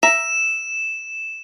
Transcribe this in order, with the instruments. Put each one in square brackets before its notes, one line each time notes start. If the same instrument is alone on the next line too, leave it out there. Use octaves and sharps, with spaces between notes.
[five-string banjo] E5 A#5 [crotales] E7